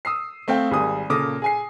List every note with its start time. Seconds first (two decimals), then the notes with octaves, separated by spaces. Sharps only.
0.05 D#6 E6 C7
0.48 A3 C4 F5 G5
0.71 G#1 G3 G#4 D#6
1.10 A#2 C#3 A4 D6 D#6 A#6
1.42 G#4 G#5 C7